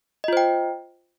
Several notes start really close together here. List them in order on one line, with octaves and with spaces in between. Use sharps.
D#5 F4 C5 G5